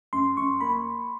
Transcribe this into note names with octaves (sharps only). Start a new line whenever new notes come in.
F#2 C6
F#2 C#6
A#3 B5